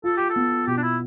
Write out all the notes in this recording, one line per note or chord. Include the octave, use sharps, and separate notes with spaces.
F4 A4
G4
A4
B3
B2 G4
D4
E4